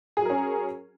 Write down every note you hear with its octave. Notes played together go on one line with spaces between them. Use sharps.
F#3 C#4 G#4 A#4